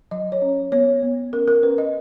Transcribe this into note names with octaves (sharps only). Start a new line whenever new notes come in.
F#3 D#5
C#5
C#4
B3 C#5
B3
C#4 A#4
A#4
C#4 B4
D#5